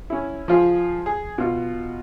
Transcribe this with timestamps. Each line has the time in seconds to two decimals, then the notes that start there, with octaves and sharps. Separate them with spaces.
0.10 C#4 E4
0.48 F3 F4 G#4
1.06 G#4
1.38 B2 F4